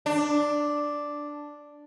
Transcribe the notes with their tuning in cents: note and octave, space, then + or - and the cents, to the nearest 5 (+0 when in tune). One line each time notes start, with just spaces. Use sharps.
D4 +0